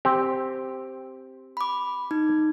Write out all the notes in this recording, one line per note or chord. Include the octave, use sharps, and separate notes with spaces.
C4 G4
B5 D6
D#4